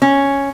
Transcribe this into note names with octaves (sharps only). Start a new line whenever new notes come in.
C#4